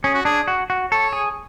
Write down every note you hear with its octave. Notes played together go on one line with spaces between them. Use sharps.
C#4 G#4
F#4
D4 G#4
F#4
F#4
A4 C#5
G#4